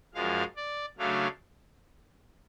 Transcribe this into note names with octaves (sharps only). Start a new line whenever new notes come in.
F#2 F3 G#3 F5
D5
C#3 F#3 A3 D4 F5